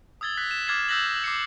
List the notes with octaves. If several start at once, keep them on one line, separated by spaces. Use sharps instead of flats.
D#6 E6 G#6 A6 G7
F#6 B6
E7
D6 F6 G#6 A6 C7 E7
E6 F#6 G6 A#6 B6 F#7
D6 C7 C#7